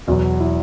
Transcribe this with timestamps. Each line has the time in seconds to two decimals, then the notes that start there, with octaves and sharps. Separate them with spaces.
0.07 E2 B2 F#3 F#4
0.40 E4